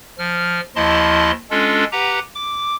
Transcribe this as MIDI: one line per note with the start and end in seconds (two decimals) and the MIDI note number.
0.18 0.60 53
0.18 0.60 89
0.76 1.31 39
0.76 1.31 53
0.76 1.31 64
0.76 1.31 75
0.76 1.31 81
0.76 1.31 84
1.51 1.84 56
1.51 1.84 61
1.51 1.84 62
1.51 1.84 65
1.51 1.84 69
1.92 2.19 67
1.92 2.19 71
1.92 2.19 78
1.92 2.19 82
2.35 2.76 86